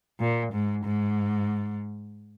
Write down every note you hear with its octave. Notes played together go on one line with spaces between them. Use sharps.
A#2
G#2
G#2